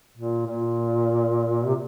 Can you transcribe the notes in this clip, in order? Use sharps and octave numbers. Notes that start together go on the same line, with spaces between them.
A#2
A#2
C3